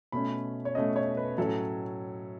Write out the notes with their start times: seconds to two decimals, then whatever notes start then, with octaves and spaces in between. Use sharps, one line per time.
0.12 B2 A3 C#4 B5
0.65 C#5
0.75 B2 A3 C#4 D#5
0.96 C#5
1.17 B4
1.38 A2 F#3 C#4 A4